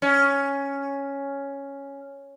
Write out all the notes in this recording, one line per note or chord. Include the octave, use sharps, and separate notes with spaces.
C#4